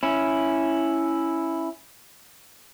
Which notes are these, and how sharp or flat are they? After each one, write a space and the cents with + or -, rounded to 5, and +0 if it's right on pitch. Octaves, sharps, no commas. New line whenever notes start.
C#4 +0 E4 +0